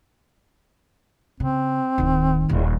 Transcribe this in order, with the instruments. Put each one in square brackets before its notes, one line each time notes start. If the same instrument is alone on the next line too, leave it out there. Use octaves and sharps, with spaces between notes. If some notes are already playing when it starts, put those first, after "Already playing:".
[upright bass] C#3 [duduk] C4
[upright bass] D1 D#3
D#1 E2